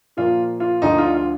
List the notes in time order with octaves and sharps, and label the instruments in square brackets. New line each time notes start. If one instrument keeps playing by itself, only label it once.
[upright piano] A#2 F3 A#3 F4
F4
D2 D3 F3 D#4
F4
F4